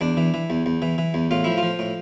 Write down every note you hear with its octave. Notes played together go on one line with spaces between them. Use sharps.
E2 D4
E3
E3
E2
E2
E3
E3
E2
A2 F4
F3 E4
F4
F3
A2